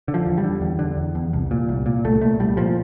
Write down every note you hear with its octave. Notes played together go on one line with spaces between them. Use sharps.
D3
F3
E2
G3
D3
E2
D3
E2
E2
C2
A#2
C2
A#2
C2 A3
A#2 A3
C2 G3
A#2 F3